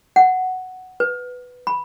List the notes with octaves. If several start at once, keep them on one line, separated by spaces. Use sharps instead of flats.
F#5
B4
B5